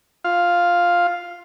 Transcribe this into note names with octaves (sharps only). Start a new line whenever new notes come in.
F4 F5